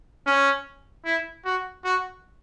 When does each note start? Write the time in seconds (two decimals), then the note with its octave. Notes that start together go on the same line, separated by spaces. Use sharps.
0.27 C#4
1.05 E4
1.45 F#4
1.84 F#4